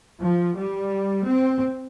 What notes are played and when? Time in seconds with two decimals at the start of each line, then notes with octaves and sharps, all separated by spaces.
0.21 F3
0.57 G3
1.28 C4